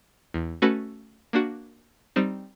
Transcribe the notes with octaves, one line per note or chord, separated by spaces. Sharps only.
E2
A3 C#4 F#4 A4 B4
A#3 D4 F#4
G3 C4 D#4